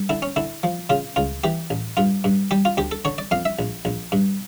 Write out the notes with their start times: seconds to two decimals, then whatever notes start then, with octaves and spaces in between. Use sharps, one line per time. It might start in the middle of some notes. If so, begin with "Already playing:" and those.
Already playing: G2
0.09 D3 E4
0.22 C#4
0.36 D3 E4
0.63 F3
0.90 C#3 F4
1.16 C#2 F4
1.44 E3 G4
1.70 A1
1.97 G2 F4
2.24 G2
2.51 G3 G4
2.65 F4
2.77 D2 G4
2.91 A4
3.05 D3 C#5
3.18 D5
3.31 F2 F5
3.45 E5
3.59 A#1
3.85 A#1
4.12 G2